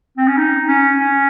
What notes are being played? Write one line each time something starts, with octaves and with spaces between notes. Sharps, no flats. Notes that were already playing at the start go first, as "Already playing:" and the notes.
C4
C#4
D#4
C#4
C#4